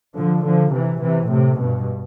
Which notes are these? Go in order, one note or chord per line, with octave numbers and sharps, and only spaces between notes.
D3 F3
D3 F3
C3 E3
C3 E3
A2 C3
G2 B2